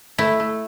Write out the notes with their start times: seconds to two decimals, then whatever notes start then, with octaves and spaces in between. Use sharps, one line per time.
0.18 A3 E4
0.40 A3